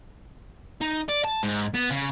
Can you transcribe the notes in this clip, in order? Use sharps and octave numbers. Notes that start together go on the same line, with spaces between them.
D#4
D5
A5
G#2
B3
C#3